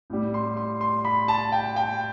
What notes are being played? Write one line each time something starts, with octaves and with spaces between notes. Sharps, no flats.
A2 G3
C6
C6
C6
B5
A5
G5
G5